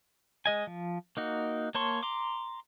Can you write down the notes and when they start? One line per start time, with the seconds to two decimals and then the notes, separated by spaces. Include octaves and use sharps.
0.46 G#3 D#5 G#5
0.67 F3
1.17 A#3 D#4 F#4
1.75 A#3 C#5 A5 C6 C#6
2.03 A#5 C6 D6